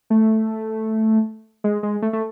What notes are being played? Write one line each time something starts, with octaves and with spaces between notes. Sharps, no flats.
A3
G#3
G#3
A3
A3